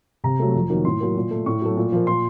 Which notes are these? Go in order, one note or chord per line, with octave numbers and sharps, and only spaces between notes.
C3 A#5
F#3 A3
F2
D#3 F#3 A#3
A2 C6
F#3 A#3
A#2
A3
A2 C#6
F#3 A3
A#2
F3 A#3
A#2 C6